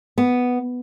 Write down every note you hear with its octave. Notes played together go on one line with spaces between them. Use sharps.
B3